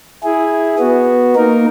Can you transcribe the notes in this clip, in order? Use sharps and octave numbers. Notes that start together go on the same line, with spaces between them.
E4 G#4
B3 F#4
A#3 D#4 A#4